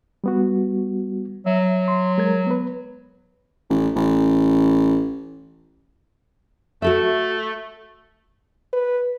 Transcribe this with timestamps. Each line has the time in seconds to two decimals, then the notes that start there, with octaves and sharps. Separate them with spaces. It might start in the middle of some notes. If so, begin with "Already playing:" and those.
0.24 G3 B3 F#4
1.46 F#3 E5
1.88 C6
2.18 G#3 A#4 G#6
2.47 B3 B4
3.70 A1
3.96 A1
6.82 A3 F#4 A4 E5
8.73 B4